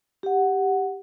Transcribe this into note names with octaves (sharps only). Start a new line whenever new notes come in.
G4 F#5